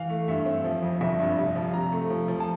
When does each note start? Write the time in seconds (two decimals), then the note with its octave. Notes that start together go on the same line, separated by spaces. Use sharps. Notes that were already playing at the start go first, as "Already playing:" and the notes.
Already playing: E3 F5
0.10 A3
0.28 G2 E5
0.46 C4
0.64 F3
0.82 F2
1.01 G1 E5
1.19 G2
1.37 F1
1.55 F3
1.74 C3 A#5
1.92 A3
2.10 F3
2.28 F3
2.40 A5